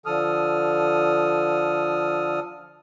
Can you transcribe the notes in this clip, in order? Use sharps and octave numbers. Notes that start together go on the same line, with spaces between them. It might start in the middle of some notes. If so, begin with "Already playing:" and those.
D3 F3 A4 D#6 F6